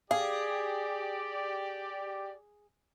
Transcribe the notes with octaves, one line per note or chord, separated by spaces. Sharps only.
G4 G#4 D5 F5